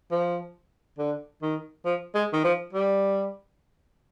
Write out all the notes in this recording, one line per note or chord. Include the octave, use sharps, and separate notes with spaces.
F3
D3
D#3
F3
G#3
D#3
F3
G3